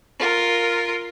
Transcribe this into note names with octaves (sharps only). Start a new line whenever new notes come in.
F4 A#4